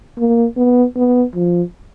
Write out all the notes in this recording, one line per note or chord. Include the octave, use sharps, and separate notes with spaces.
A#3
B3
B3
F3